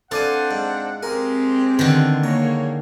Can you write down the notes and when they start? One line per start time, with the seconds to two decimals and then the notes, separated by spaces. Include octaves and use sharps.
0.11 C4 D4 F4 A4 D5 F#5 G#5
0.51 G#2
1.03 G#3 C4 G4 A#4
1.79 B2 D3 D#3
2.24 G#3 A#3 C#5 A#5